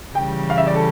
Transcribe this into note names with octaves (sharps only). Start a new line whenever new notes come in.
C#3 E3 G3 G5
F5
E5
D5
A4